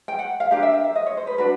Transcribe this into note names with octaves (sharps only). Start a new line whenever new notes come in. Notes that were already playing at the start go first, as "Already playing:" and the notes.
G5
F#5
F5
D4 G4 A#4 F5
E5
F5
E5
D#5
C#5
C5
B4
D4 F#4 B4